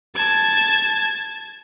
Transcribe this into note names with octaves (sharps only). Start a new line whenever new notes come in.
A5 G#6